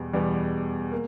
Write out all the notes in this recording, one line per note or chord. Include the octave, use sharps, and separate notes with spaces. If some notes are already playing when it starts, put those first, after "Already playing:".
Already playing: E2 B2 G3 B3
E2 B2 G3 B3
A#3